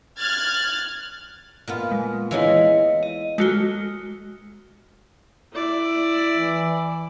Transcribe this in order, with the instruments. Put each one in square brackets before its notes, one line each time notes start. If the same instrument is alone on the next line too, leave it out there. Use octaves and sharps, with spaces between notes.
[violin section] F6 F#6 G#6 A6
[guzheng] A#2 B3 F4
[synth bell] G#3
[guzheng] E3 G#3 D#4 [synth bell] E4 C#5 F5
[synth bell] D#5
[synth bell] G#3 F#4 G7 [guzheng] A4 A#4
[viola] E4 D5
[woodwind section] E3